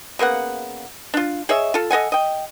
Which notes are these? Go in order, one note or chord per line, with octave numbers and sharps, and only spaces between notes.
C#3 A#3 B3 F#5
D4 F4
G#4 C#5 D#5 E5
F4 A4
A4 D#5 F#5 G#5
D#5 G5